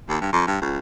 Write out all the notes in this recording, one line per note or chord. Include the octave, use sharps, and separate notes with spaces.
D#2
G2
F2
G2
C#2